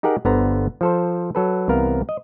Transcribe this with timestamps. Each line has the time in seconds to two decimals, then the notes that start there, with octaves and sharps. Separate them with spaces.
0.03 D#4 G4 G#4 A#4 F#5
0.25 G1 D3 B3 C5 A#5
0.81 F3 A4 C5
1.35 F#3 A4 B4
1.68 C2 C3 E3 B3 A#4 F5
2.09 D#5